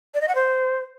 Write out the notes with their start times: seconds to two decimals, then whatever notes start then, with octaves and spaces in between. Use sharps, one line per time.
0.14 D5
0.21 D#5
0.28 F#5
0.35 C5